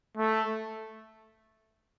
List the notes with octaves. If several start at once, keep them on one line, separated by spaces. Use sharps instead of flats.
A3